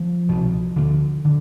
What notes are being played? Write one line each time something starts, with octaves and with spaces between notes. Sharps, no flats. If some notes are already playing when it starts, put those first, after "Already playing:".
Already playing: F3
C2 B2
D2 D3
D3